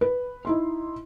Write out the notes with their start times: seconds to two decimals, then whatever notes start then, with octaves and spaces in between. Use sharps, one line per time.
0.01 B4
0.45 D#4 E4 C6